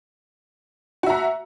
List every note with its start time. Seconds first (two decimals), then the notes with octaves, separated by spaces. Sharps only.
1.03 F#4
1.06 E5
1.10 A#5